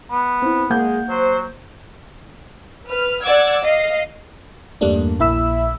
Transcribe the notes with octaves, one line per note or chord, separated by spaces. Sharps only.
B3
C4 E4
G#3 A#3 F#5 G6
F#3 C5
B4 F6
D5 F#5 D6 E6 G#6
D#5 F5 C7
E2 G2 G3 A3 A#3 D4
A#1 A#3 E4 E5 B5 E6